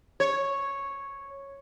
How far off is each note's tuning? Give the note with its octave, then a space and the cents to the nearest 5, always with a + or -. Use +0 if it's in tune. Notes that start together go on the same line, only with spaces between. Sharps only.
C#5 -5